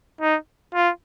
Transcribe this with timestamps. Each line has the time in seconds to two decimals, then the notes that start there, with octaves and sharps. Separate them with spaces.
0.21 D#4
0.74 F4